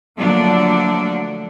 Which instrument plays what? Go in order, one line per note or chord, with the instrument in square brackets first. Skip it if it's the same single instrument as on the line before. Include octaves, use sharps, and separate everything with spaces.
[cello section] D3 F3 F#3 A3 A#3 D4